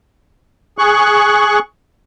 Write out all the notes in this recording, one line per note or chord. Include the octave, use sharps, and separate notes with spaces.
G#4 C#6 F#6